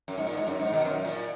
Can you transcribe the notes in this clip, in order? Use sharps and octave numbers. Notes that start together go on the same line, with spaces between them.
F#2
G#2
A#2
G#2
F#2
G#2
B2 D#3
F#2
A#2